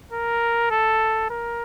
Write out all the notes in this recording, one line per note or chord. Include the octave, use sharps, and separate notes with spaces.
A#4
A4
A#4